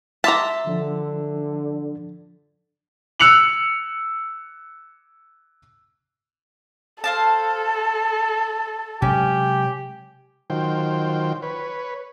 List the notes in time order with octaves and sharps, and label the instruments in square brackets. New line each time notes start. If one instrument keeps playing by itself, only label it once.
[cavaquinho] E5 C6 D6 [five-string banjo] A5 A#5
[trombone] D3 [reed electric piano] F3 D4
[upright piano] E6 F#6 C#7 F7 F#7
[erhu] A4 [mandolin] C5 F5 A5
[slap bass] C3 F#3 G#3 [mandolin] C#4 [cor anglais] G4
[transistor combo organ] D#3 F#3 F4 C5 G5
B4 C#5